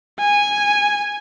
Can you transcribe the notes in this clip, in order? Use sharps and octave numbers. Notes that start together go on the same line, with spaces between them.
G#5